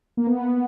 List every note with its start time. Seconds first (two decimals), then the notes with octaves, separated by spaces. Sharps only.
0.17 A#3
0.27 B3